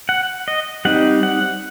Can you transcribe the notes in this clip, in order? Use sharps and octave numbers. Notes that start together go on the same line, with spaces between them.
F#5
D#5
G3 C4 D#4 F#5
F#5